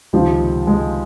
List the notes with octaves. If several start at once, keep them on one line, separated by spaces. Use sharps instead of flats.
C#2 C3 D#3 F3
G#3